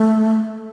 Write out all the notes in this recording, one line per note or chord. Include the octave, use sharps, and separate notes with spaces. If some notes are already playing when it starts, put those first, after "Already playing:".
Already playing: A3